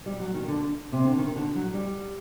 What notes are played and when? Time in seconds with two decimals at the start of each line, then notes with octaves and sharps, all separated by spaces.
0.06 G3
0.20 F#3
0.34 D#3
0.48 D3
0.92 C3
1.05 D3
1.17 D#3
1.36 D3
1.55 F#3
1.73 G3